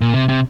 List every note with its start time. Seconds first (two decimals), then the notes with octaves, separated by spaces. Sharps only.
0.01 A#2
0.14 C3
0.29 C3